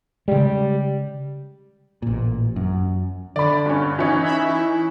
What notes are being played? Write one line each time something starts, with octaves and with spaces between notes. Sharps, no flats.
C#3 G3 G#3
A1 A#2
F#2
D3 D5 B5
G2 C#4
E3 C#4 D#4
E5 B5
E4